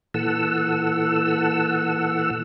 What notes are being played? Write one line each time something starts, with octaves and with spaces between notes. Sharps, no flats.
A#2 E3 A4 F#5 E6